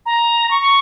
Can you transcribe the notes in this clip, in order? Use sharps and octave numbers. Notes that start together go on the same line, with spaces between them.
A#5
C#6